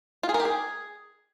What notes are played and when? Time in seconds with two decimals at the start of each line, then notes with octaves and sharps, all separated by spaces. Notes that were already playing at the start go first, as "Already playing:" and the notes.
0.23 F4
0.29 G#4
0.34 A#4
0.40 G4
0.45 G#4